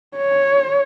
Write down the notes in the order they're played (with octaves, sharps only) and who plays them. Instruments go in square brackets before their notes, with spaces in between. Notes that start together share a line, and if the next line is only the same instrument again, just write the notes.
[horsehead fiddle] C#5